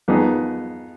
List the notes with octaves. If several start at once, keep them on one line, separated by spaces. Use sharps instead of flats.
F2 D#3 B3 D#4 G#4